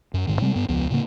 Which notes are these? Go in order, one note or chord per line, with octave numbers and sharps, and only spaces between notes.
F#2
A1 G#2 D#3
C3 G3 G#3 C4
G2 B3
E1 C#2 F3 B3
A2 C#3 A#3